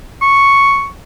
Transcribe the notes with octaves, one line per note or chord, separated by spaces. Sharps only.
C#6